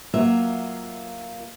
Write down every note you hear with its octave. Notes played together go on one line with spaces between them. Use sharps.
F#3 A#3 F4 E5